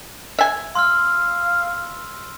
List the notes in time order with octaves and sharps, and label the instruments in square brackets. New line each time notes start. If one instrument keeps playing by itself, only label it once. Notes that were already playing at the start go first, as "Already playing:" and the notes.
[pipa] E5 G#5
[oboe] F5 [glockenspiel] C6 E6 F6